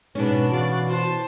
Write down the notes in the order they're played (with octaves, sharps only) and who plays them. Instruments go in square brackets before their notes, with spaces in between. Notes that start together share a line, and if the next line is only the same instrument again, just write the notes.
[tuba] G#2 [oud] B2 C#4 [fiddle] D4 B4
[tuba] E3 [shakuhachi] F#4 [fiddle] D5 F5
[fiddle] C5 A5